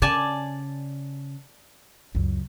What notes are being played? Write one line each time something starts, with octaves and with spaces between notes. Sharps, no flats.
C#3 D5 G#5 A5
C#2 F#2